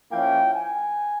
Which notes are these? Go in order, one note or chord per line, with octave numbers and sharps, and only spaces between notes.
F3 A#3 C#4 E4 G5
G#5